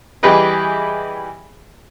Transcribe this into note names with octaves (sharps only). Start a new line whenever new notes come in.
E3 G3 G4 G#4 B4 D#5